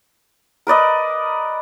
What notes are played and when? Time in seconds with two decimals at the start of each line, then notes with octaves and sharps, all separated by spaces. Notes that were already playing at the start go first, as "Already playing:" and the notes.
0.67 A#4 B4 D5 D#5